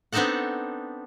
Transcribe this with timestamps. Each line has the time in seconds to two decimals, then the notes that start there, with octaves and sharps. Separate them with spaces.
0.12 B3 C4 D4 D#4 A4 F#5